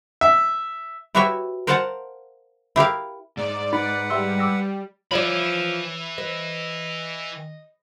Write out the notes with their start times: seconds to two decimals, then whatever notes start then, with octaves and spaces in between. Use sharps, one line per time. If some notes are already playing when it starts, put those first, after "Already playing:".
0.21 E5
1.15 E4 F#4 G4 B4 C#5 E5
1.67 A#4 C5 F5 F#5 A5 A#5
2.76 E4 G4 A#4 F5
3.37 G#2 D5
3.73 D#4 B4 F#5 B5
4.10 G3 E5 C6 E6
4.39 D6 E6 A#6
5.12 E3 F3 C#5 D5 B5
6.18 B4 D#5